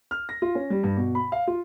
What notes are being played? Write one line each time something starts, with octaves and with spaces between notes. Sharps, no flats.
F6
A#6
F4
C#4
G3
G2
B2
B5
F5
F4